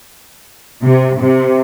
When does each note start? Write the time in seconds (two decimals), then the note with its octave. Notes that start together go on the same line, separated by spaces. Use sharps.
0.83 C3
1.20 C3